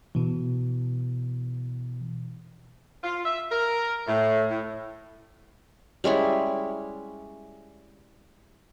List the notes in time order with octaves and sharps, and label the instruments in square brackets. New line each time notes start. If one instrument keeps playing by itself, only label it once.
[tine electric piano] B2 E3
[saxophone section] F4
E5
A#4
A2
A2
[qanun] G3 G#3 C#4 E4